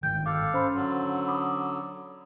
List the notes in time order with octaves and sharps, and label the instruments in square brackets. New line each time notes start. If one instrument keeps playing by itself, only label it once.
[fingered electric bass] G1 G#2 D#3 [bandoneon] G5 [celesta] G6
[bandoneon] A4 F5 [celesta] D6
[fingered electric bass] C#4 [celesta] C5 B5 C6
[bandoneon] D3 F#3
[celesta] B5 D6 D#6